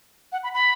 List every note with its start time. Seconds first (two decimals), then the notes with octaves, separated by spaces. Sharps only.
0.32 F#5
0.43 B5
0.54 B5